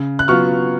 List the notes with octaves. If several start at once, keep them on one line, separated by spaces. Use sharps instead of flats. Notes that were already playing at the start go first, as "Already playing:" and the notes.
Already playing: C#3
F#6
F#3 B3 F4 C#6 F6